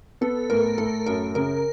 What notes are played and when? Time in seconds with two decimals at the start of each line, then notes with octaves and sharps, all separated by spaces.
0.21 B3 A4
0.50 A2 A#4
0.78 A2 A4
1.07 F#2 A#4
1.35 C#3 A#4